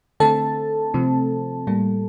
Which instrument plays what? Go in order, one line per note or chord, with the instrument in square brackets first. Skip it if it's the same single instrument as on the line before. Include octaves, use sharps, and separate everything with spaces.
[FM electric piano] D3 A3 C4 A4 A5
C3 F3 A3 C4
A2 G3 A#3